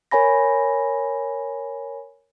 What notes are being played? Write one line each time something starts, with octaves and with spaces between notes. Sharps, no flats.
A#4 C#5 G#5 B5 A#6